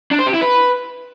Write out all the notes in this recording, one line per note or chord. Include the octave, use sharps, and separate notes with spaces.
D4
C5
G4
E4
B4